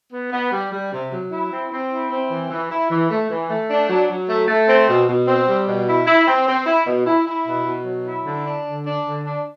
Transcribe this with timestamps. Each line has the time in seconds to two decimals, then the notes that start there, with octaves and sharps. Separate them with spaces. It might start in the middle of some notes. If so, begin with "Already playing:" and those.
0.12 B3
0.32 B3
0.51 G3
0.71 G3
0.92 C3
1.12 F#3
1.31 E4
1.51 C4
1.71 C4
1.90 E4
2.10 C4
2.30 E3
2.50 E3
2.71 E4
2.90 E3
3.10 A3
3.29 E3
3.49 A3
3.70 D4
3.89 F#3
4.09 F#3
4.29 A3
4.48 A3
4.68 C4
4.89 B2
5.08 B2
5.27 C4
5.48 G3
5.67 B2
5.88 E4
6.07 E4
6.27 C4
6.47 C4
6.66 E4
6.86 B2
7.06 E4
7.26 E4
7.47 B2
7.66 B2
7.85 F#3
8.05 E4
8.25 D3
8.45 D4
8.65 D3
8.84 D4
9.04 D3
9.24 D4